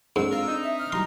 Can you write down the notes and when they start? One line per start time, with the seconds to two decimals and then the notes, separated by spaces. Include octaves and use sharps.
0.16 G#2 C4 D4 A4 E6
0.31 F4 A#4
0.47 D#4
0.63 E5
0.79 F6
0.92 F#3 G3 A#5 C6